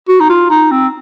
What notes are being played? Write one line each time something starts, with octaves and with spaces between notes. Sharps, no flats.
F#4
D#4
F4
D#4
C4